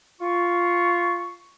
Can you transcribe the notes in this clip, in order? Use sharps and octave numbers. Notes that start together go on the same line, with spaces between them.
F4 C#6